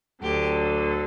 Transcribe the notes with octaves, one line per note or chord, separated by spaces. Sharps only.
D2 D3 F#3 G4